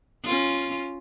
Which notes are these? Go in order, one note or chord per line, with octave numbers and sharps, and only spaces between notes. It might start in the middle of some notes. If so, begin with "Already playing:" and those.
C#4 F4